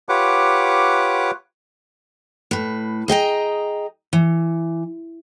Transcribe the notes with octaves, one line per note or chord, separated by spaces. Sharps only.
F4 G4 B4 C#5 F#5 D6
A2 B4
G#4 D#5 G5 A#5
E3